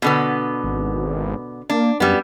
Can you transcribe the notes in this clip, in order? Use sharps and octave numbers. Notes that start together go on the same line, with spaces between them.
B2 D3 B3
G#1
A#3 D4
F#2 G3 B3